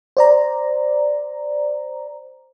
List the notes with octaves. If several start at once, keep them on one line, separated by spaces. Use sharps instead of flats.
C5 D5 A#5